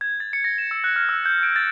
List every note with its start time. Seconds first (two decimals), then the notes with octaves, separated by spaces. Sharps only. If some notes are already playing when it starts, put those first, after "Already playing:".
0.01 G#6
0.20 A6
0.33 C#7
0.44 A#6
0.58 E7
0.71 E6
0.84 F#6
0.96 F6
1.09 E6
1.25 G6
1.43 D7
1.56 A6